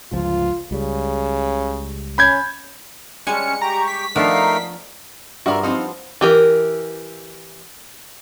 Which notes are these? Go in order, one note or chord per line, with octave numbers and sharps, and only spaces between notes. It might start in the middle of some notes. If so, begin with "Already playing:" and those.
G1 C#2 F3 F4
C#2 C#3 G3
C#4 B5 G6 G#6
G3 G#3 C#4 G#5 A5 C#7
G4 A#5 C#6
B6
F3 A3 B3 D4 D#4 A#4 F5 A#5
G2 F4 F#4 A#4 D5 E5 B5
F3 B3 C4 D#4 F5
E3 G4 A#4